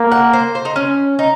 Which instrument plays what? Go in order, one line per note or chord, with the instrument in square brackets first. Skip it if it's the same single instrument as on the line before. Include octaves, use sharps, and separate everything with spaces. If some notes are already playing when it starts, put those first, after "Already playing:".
Already playing: [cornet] A#3
[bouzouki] F#5
C5
C5
D#4
C#4
D#4